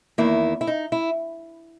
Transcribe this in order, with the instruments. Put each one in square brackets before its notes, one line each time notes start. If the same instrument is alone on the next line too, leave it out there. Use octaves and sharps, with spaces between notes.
[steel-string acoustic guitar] E2 D#3 A#3 E4
E4
D#4
E4